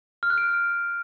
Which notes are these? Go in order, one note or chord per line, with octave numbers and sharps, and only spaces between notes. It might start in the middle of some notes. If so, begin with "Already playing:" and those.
F6
F#6
D7